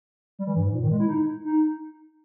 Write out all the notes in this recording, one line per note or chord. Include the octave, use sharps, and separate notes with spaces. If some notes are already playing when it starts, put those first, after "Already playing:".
G3
E3
G2
G#2
A#2
D#3
G#3
E4
D#4
D#4